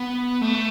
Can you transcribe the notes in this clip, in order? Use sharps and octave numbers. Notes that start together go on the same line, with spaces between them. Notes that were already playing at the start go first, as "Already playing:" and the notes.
Already playing: B3
A3